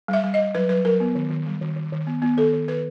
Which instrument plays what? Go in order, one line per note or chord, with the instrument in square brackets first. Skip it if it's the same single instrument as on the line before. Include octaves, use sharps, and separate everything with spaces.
[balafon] G3
E5
G3
D#5
G3
F#3 B4
F#3 B4
F#3 A#4
B3
D#3
D#3
G3
D#3
D#3
D#3
B3
B3
D#3 A4
D#3
D#3 B4